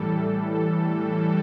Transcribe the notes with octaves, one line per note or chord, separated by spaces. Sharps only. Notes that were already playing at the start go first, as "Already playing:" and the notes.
Already playing: A2 E3 G3 A4
A4